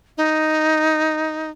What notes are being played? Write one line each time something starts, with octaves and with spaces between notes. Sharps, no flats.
D#4